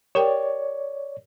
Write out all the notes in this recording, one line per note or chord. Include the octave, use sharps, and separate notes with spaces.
G4 A#4 C#5 D5 G5